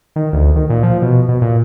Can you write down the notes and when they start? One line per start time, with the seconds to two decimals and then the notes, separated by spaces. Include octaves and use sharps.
0.16 D#3
0.33 D2
0.56 D#3
0.70 A#2
0.83 F3
1.02 B2
1.28 B2
1.42 A#2